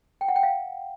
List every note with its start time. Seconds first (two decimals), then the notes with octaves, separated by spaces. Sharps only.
0.21 G5
0.28 F#5
0.36 G5
0.43 F5